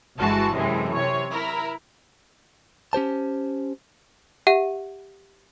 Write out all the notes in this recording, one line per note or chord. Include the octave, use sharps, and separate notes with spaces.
G1 E3 G#3 F#4 A5
F#2 A2 C3 E3 G#3
C3 C#5
E4 A#4
C#4 G4 C5 A5
G4 E5 F#5